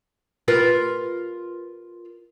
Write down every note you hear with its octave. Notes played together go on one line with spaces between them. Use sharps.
F4 A#4 B4